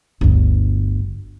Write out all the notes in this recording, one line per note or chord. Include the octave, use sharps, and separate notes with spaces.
G1 D2